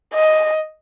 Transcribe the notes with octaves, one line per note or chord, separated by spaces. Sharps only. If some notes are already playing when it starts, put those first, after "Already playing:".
D#5